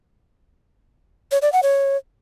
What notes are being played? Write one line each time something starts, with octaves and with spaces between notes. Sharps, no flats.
C#5
D5
F#5
C#5